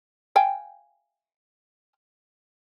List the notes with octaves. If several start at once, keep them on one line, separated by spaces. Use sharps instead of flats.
F5 G5 G#5